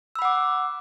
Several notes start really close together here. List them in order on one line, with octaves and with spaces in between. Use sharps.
E6 B5 F#5 D6